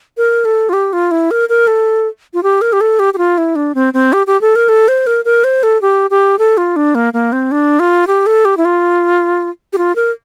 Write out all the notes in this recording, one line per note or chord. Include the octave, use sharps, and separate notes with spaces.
A#4
A4
F4
G4
F4
E4
A#4
A#4
A4
F4
G4
A#4
G4
A4
G4
G4
F4
E4
D4
C4
C4
G4
G4
A4
A#4
A4
C5
A#4
A#4
C5
A4
G4
G4
A4
F4
D4
A#3
A#3
C4
D4
F4
G4
A4
G4
E4
F4
G4
F4
A#4